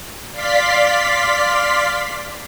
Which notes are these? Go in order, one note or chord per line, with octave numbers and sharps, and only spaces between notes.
D5 F5 C6 B6